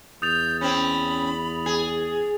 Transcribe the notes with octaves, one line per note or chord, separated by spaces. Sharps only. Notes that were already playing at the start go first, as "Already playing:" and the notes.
E2 D#6 G6 A6 F7
C4 C#4 B5
G#4